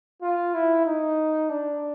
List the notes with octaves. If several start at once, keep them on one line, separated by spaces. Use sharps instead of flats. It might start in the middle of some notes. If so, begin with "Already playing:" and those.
F4
E4
D#4
D4